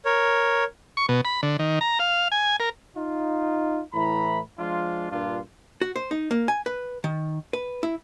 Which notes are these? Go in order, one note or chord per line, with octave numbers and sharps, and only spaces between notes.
A#4 C#5
C#6
B2
B5
D3
D#3
A#5
F5
G#5
A#4
D#4 F4
A2 E3 A#5 B5
F3 G#3 D4 F4
G2 A#2 D4 F4
F#4
C5
D#4
A#3
G#5
B4
D#3
B4
E4